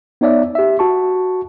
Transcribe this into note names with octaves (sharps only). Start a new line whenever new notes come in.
B3 D#4 C#5 D5 E5
G4 E5
F#4 A5 C#6